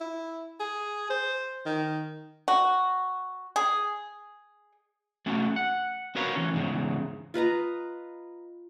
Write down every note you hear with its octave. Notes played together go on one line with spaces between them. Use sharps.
E4
G#4
C5
D#3
F#4
G#4
A3 C#4 F#4
F#5
F#4 A#4 B4 C#5 F5 F#5
E3 C#4
E2 G#2 C#3
F4 B4 D#5 A#5